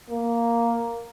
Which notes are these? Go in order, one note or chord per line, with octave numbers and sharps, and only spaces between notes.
A#3